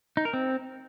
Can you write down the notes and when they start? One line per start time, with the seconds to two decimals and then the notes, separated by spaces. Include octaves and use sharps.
0.17 D#4
0.25 A#4
0.33 C4